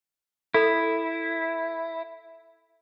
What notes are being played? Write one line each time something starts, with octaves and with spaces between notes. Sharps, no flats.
E4 A4 B5 D#6